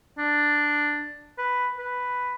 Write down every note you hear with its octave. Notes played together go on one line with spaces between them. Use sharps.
D4
B4
B4